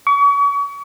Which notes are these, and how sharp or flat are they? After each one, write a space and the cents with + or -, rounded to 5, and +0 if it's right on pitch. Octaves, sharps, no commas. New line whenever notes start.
C#6 +40